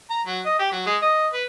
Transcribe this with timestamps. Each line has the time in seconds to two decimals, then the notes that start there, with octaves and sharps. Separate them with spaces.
0.10 A#5
0.27 F#3
0.45 D#5
0.59 G4
0.72 F#3
0.86 G#3
1.02 D#5
1.34 B4